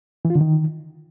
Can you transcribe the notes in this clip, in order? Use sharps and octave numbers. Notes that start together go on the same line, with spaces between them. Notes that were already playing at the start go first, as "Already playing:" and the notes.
E3
F4
D3
D#3